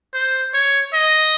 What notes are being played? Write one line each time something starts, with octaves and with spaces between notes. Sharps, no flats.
C5
C#5
D#5